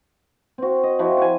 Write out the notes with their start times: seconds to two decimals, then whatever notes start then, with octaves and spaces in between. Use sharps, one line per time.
0.58 C4 F#4
0.83 D#5
0.99 F3 E4 F#4 G4
1.18 F#4 G#5